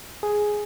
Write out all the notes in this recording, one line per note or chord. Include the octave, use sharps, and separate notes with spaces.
G#4